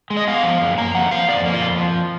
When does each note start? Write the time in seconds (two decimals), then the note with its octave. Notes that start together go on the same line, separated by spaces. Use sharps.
0.10 G#3
0.17 D#5
0.27 B3 F5
0.44 F3
0.62 F#2
0.78 A#3 A#5
0.95 F2 F#5
1.11 F3 F5
1.28 F2 D5
1.46 A#3
1.54 F4
1.62 F2
1.78 F3